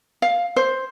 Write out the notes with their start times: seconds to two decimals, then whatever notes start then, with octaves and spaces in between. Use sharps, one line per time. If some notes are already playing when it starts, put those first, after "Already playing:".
0.22 F5
0.56 C5